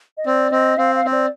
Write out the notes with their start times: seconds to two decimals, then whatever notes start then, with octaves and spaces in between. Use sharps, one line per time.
0.17 D#5
0.26 C4 D5
0.51 C4 D#5
0.78 C4 F5
0.95 F5
1.05 C4 C5
1.13 D5